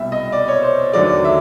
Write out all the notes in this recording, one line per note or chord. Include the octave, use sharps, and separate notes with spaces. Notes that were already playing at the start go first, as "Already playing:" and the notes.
Already playing: C2 B2 G3 E5
D#5
D5
C#5
C5
D#2 D3 F#3 A3 D5
E5